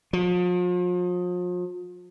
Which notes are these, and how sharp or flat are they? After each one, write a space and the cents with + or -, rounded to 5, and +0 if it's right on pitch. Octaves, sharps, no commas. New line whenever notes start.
F3 +40